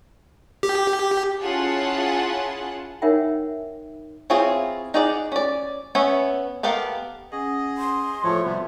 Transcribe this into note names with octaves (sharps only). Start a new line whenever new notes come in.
G4
C#4 E4 F4 G#4 F#5 A5
D#4 A#4 C#5 E5 F#5 G5
C4 E4 F4 G#4 C#5
D#4 G#4 D5 F#5
C#4 D5
B3 C#4 C#5 E5
B3 G4 A4 A#4 F5
C#4 G#4 D#5 F#5
C6
A2 F3 A3 F#4 C#5 E5 A5
C3 G3 B3